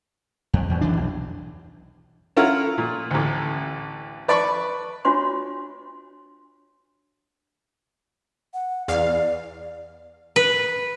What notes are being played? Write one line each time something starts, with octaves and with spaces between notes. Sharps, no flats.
F2
E2
D#2 E3 D4
B1
C#4 E4 F4 A4 A#4 F#5
A#2
A1 D2
B4 D5 A5 B5 C#6
D4 F4 F#4 C#5 C6
F#5
E2 D5 F5
B4